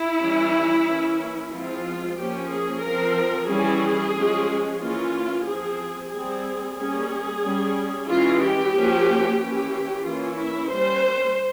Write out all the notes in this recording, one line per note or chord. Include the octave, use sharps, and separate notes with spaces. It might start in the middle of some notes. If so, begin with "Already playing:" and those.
Already playing: E4
E3 G3 C#4
E3 A#3 C#4
F3 G#3 C4 F4
F3 A#3 C#4 G4
G#4
F3 C4 A#4
E3 G3 C#4 G#4
F3 G#3 C#4
E3 A#3 C#4 F4
F3 C4 G#4
G3 C4 G#4
G3 A#3 C#4 G#4
G3 C#4
E3 G#3 C#4 F4
G4
F3 A#3 C#4
E3 A#3 C#4 G4
E3 A#3 C#4 F4
E4
G3 A#3 C#4 C5